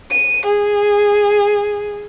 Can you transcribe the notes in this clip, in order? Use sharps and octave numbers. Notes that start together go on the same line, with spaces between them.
D#7
G#4